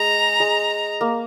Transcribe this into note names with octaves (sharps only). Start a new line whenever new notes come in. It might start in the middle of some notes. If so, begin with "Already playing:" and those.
Already playing: G#3 A#5
G#3
A#3